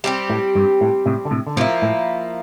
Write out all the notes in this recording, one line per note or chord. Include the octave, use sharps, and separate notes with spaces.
G3 C4 G4
A2
G2
A2
A2 C3
D3
A2 C3
D3
A2 C3 F3 A#3 E4
A2